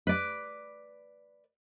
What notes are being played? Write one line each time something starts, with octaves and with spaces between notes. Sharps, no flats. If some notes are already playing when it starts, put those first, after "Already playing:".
B4 D5